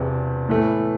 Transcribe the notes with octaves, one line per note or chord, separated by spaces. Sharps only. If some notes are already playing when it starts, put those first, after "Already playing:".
Already playing: E1 E2 C3
A2 E3 A3